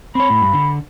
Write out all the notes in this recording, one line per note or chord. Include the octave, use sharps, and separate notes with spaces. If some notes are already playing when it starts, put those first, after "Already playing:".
C4 C#5 B5
A2
G2
D3